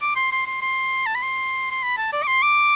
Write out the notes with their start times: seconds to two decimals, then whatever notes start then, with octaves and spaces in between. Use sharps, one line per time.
0.01 D6
0.16 C6
0.32 C6
0.46 C6
0.62 C6
1.06 A5
1.15 B5
1.22 C6
1.71 C6
1.83 B5
1.98 A5
2.12 D5
2.23 D6
2.27 C6
2.42 D6